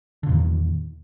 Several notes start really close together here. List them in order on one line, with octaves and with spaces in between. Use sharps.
D3 A#2 E2 D#3